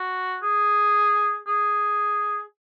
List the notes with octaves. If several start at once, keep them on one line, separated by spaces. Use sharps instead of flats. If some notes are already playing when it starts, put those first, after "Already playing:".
Already playing: F#4
G#4
G#4